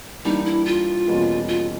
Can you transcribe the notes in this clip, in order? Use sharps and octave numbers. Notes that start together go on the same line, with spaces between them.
E3 G3 A#3 D4 D#4
E4
F4
E2 B2 G3 A#3 C#4
F4